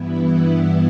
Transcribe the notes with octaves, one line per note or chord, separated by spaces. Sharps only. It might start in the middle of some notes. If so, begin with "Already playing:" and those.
Already playing: G2 E3 B3 E4